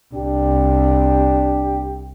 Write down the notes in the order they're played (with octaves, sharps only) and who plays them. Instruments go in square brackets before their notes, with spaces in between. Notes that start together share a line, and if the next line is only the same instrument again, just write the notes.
[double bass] C2 [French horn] D4 [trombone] G4